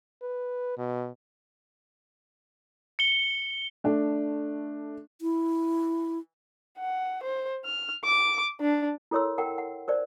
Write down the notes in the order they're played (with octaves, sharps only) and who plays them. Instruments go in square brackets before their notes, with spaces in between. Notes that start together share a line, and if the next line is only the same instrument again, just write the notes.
[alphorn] B4
B2
[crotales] C#7 G7
[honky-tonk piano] A3 D4
[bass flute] E4
[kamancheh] F#5
C5
F6
D6
D4
[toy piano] E4 A4 A#4 C#5 C6 E6
A#4 F#5 G5
F#5
A#4 C5 D5